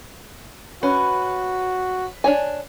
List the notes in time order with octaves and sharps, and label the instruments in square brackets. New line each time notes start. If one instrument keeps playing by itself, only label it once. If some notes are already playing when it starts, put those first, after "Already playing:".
[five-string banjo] C#4 [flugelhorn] F#4 [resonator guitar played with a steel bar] B4
[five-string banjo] D4 C#5 G#5